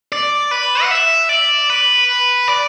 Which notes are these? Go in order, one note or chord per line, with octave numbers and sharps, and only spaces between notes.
D5
B4
F#5
E5
D5
B4
D5